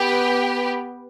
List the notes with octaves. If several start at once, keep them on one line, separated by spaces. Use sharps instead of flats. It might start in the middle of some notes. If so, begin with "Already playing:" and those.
Already playing: B3 G4 B4 G5